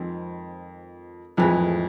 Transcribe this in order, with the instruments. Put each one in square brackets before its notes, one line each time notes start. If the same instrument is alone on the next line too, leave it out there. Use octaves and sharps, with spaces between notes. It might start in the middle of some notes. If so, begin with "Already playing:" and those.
Already playing: [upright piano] F2 [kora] D#3 G#3 C4
[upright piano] F2 [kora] A2 E3 G#3